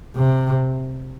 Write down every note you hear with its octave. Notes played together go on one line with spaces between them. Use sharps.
C3